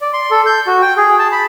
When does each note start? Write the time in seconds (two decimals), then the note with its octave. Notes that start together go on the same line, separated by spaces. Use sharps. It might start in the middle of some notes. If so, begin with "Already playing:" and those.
0.01 D5
0.13 C6
0.31 A4
0.46 G6
0.67 F#4
0.82 G5
0.97 G#4
1.19 A5
1.32 B5